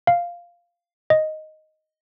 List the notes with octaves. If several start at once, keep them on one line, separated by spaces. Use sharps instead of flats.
F5
D#5